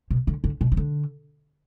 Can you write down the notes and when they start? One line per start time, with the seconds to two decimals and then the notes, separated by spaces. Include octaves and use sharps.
0.11 B2
0.27 D3
0.44 D3
0.61 B2
0.72 E3
0.77 D3